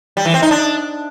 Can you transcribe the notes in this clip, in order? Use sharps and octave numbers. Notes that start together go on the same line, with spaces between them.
G3
E3
C4
D#4
D4